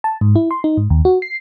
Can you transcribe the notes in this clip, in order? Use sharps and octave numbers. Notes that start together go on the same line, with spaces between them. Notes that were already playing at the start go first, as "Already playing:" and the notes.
A5
G#2
E4
C6
D#4
G#2
D#2
F#4
C7